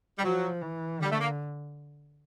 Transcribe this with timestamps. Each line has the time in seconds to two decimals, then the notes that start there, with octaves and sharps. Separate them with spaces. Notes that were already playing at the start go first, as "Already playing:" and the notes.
0.17 G3
0.23 F3 F#3
0.62 E3
1.01 D3 G3
1.11 A3
1.20 A#3